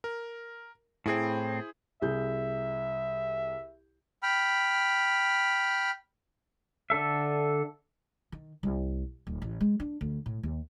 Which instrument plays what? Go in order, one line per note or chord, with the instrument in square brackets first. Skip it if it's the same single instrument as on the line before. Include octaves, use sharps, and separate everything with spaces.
[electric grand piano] A#4
[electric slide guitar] A2 C4 [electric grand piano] E4 G#4 C5
[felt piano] C2 G#4 G6 [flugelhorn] E5
[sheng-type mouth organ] G5 B5 F6
[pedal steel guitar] D3 D4 A4 E5
[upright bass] D#3
C2
D1
A1
G#3
D4
D2
A2
D#2